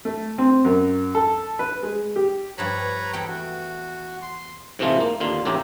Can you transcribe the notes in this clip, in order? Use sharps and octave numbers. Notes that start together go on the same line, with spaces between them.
A3
C4
F#2
A4
B4
G#3
G4
G2 F3 B4 C#5 A#5 B5
E2 A3 G5
F#4
C6
G#2 C3 E3 A3 F4
A#3
D#2 D3 F4
E2 A2 C#3 G4 A#5